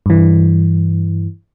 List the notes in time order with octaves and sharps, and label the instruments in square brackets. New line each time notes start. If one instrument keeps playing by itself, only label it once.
[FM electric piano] G2 E3